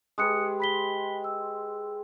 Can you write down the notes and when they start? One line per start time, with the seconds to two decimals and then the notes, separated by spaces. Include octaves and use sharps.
0.18 G#3 G4 B4 D#6 F#6 C#7
0.60 B5 B6 G7
1.24 E6